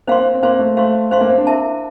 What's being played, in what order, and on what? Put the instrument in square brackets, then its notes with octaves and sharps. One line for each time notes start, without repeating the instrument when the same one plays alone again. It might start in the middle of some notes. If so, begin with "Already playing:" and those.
[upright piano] A#3 [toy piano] C5 F5 C6
[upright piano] C4
C4
[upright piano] A#3 [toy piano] C5 F5 C6
[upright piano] A3
[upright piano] A3 [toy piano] C5 F5 C6
[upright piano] A3 [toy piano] C5 F5 C6
[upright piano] A#3
C4
D4
[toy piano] E4 A#4 E5 A5